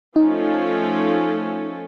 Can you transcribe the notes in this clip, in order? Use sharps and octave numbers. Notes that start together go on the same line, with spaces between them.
F3 A3 C#4 D#4 F4 A4